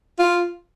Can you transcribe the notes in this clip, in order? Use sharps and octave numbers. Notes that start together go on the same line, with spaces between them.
F4